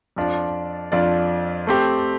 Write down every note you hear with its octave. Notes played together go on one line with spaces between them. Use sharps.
F2 F3 D4 F4 D5
F2 F3 D4 F4 D5
A3 C4 G4